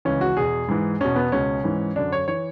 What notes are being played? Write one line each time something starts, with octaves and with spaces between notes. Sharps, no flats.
C#2 C#3 E3 C#4
F#4
E2 B2 G#4
G#2 E3
E2 B2 C#4
B3
C#2 B2 C#4
G#2 E3
F#2 D3 D4
C#5
E3 C#5